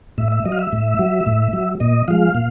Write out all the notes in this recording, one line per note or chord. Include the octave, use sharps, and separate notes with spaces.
A2 E5
E5
F#3 D#5
F5
E5
A2
F#3
A2
F#3
A#2 D#5
F3 G#3 F5
A#2